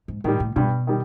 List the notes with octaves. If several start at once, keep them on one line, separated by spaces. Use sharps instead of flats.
G#2
A2 D#3 G3
A2
G2 B2
D#3 G3